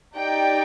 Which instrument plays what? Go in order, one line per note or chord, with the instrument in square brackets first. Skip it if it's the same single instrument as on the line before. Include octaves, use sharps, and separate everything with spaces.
[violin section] D#4 G4 D5 G5